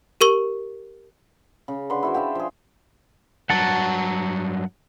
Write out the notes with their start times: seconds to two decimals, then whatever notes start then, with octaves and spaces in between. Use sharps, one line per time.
0.21 G4 A#4 C#6 G7
1.68 C#3
1.90 D3 B4 C6 D6
2.03 E4 F#4 C5
2.14 D4 E5 F5 G5
2.35 F3 G#4
3.50 G2 F#3 F#5 A5